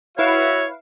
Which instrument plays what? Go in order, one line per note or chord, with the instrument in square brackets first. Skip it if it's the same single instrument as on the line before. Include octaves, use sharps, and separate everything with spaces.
[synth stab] E4 B4 F5 [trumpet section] F#4 E5 [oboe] C#5